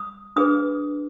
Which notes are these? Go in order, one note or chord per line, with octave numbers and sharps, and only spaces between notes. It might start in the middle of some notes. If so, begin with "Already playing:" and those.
Already playing: D#6
D4 G#4 B4 D#6